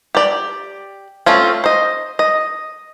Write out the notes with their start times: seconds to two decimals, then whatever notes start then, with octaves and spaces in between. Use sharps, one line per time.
0.15 G4 D5
1.26 A3 C4 C#4 F4
1.64 C5 D#5
2.19 D#5